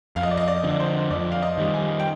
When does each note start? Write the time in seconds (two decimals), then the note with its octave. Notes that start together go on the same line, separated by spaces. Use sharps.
0.16 F2 F5
0.23 D#5
0.31 D5
0.37 D#5
0.48 D5
0.64 D3 F3
0.80 C5
1.11 F2 D5
1.31 F5
1.42 D#5
1.58 D#3 G3
1.74 G#5
2.00 G5